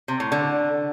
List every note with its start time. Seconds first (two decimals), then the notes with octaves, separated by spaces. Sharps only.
0.08 C3
0.20 A2
0.32 D3